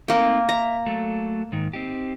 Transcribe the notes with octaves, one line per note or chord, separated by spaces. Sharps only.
A3 A#3 C4 D#4 G5
D#5 E5 A#5
F#3 A3 A4
G#2 D#3
C4 D#4 G4